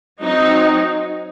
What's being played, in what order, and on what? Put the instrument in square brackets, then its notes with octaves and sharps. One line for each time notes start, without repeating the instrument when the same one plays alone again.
[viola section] F#3 C4 D#4